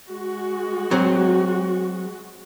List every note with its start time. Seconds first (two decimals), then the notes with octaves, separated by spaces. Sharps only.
0.10 G#3 F#4
0.91 F#3 C4